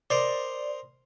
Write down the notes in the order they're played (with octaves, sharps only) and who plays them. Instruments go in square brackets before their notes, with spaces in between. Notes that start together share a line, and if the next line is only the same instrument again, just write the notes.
[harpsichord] A#4 C5 D#5 [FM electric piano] D5